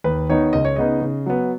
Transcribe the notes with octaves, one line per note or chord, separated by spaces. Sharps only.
D#2 B4
D#3 B3 D#4 C#5
C#2 D#5
C#5
C#3 B3 D#4 D#5
C#3
F#3 B3